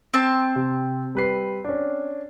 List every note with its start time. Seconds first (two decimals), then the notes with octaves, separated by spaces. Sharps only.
0.14 C4 A5
0.56 C3
1.15 G3 B4 C7
1.64 C#4 D4